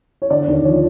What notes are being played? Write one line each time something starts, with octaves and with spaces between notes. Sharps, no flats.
C#5
D3 D5
D#2
F3 C#5